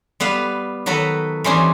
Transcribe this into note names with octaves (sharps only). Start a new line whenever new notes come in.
G3 B3 B4 F5
D#3 F#3 F#4 A4 B4
E3 G3 C4 C#4 D#4 C5